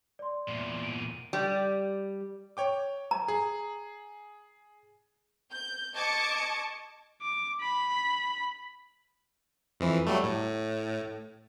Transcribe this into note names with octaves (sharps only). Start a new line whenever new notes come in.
D5 C6
E2 A#2
D7 D#7
G3
C#5 G5 D6
A#5
G#4
G6
D#5 A5 C#6 D6 G#6 C#7
D6
B5
F2 E3
F#3 G3 A3
A2